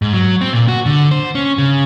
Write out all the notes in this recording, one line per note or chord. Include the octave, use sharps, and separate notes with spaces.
G#2
F#3
C4
A#2
F#4
D3
C5
C#4
C#3